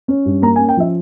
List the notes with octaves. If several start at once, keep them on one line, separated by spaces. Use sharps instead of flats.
C#4
G2
A#3 A#5
G#5
C#4
G5
F3 E5